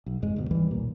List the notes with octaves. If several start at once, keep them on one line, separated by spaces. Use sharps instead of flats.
B1
F#1 F2 G#2 G#3
D2 G2 B2
D#2 G#2 E3 G3
B1 A#2